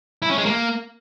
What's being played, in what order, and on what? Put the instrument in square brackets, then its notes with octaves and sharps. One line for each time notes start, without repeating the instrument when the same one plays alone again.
[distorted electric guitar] E4
C#4
G#3
A#3